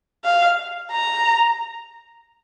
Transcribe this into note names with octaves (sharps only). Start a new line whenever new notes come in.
F5
A#5